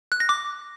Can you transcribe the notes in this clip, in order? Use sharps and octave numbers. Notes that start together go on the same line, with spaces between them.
F#6
A#6
D6